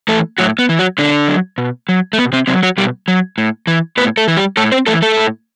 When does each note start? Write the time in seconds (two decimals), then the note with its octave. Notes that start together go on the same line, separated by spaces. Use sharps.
0.08 E3 A3 A4
0.38 A2 F#3 F#4
0.59 B3
0.69 E3
0.79 F#3 F#4
0.98 B2 D3 D4
1.28 F#3
1.58 B2
1.89 F#3
2.13 A3
2.18 B2 B3
2.33 C3 C4
2.47 C3 F#3 C4
2.63 F#3 F#4
2.78 B2 G3 G4
3.08 F#3
3.38 A2
3.67 E3
3.97 A2 B3 B4
4.17 A3 A4
4.28 E3
4.37 G3 G4
4.57 A2 A3 A4
4.72 C4 C5
4.87 E3 A3 A4
5.02 A3 A4
5.17 A2